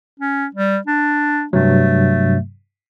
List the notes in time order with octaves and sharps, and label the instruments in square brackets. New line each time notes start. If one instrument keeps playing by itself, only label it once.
[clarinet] C#4
G3
D4
[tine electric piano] G2 C3 F#3 [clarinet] A3